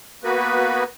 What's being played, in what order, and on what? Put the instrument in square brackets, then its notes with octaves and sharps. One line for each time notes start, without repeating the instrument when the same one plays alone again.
[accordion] A#3 B3 F#4 B4